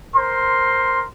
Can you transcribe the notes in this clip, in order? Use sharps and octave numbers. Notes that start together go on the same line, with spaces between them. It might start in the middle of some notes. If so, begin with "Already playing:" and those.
A#4 C5 C6